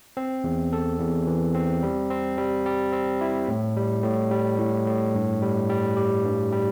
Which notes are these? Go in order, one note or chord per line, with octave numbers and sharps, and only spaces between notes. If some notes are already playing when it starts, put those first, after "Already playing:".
C4
E2
A4
E2
E3
C4
G3
C4
G3
G3
C4
E4
A2
G3
A2
G3
A2
A2
G2
G3
G3
G4
G2
G3